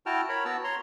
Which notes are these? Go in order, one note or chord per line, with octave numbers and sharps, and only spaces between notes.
E4 F#4 G5 A5 F6
A#4 C#5 B5
B3 F#4 A5 E6
C#5 A#5 C6